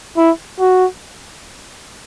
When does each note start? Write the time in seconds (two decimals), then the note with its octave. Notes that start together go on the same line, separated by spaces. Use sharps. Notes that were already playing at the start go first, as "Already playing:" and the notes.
0.17 E4
0.60 F#4